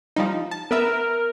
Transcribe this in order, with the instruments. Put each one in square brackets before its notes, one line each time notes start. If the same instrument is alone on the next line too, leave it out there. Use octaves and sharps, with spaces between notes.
[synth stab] F3 G3 D#4
A5
[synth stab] B3 B4 E5 [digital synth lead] A#4